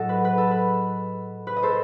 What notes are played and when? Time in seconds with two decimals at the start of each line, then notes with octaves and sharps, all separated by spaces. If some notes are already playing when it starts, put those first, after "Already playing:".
Already playing: A2 F#3 A4 D#5 F#5
0.09 B4
0.25 B4
0.38 A4
0.51 B4
1.47 B4
1.57 D#5
1.63 A4 C5